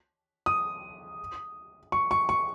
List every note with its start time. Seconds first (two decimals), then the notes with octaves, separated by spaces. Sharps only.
0.46 D#6
1.92 C#6
2.11 C#6
2.29 C#6